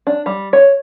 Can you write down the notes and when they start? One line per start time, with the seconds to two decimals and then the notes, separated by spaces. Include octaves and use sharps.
0.07 D4
0.26 G3
0.53 C#5